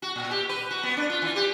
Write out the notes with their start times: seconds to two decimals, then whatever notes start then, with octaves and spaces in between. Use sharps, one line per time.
0.02 F#4
0.16 A#2
0.31 G4
0.49 B4
0.70 F#4
0.83 B3
0.97 D4
1.10 F4
1.22 E3
1.36 G4